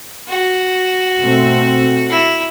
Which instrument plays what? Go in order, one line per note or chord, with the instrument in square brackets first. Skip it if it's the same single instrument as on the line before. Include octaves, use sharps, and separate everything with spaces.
[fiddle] F#4
[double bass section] B2 A3 C4
[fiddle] E4